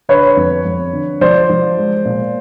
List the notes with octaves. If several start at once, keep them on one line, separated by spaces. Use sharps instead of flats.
D3 B4 C#5
F2
F2
D3
F3 C5 D5
F3
G#3
A#2